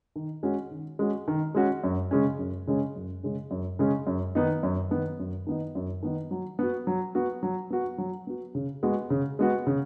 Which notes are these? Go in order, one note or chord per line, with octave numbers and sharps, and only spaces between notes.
D#3
G#3 C#4 F#4
D#3
G#3 C#4 F#4
D#3
G#3 C#4 F#4
F#2
C#3 G#3 C#4
F#2
C#3 G#3 C#4
F#2
C#3 G#3 C#4
F#2
C#3 G#3 C#4
F#2
D#3 B3 D#4
F#2
D#3 B3 D#4
F#2
D#3 B3 D#4
F#2
D#3 B3 D#4
F#3
B3 F#4
F#3
B3 F#4
F#3
B3 F#4
F#3
B3 F#4
C#3
G#3 B3 F#4
C#3
G#3 B3 F#4
C#3